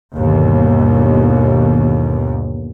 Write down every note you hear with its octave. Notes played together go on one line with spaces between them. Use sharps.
G1 D#2 B2